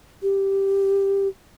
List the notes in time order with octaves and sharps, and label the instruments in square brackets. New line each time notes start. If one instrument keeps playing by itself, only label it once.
[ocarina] G4